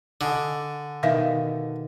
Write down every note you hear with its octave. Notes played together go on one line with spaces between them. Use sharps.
D3 F#4 D#5 G#5
B2 D#3 E4 E5 F5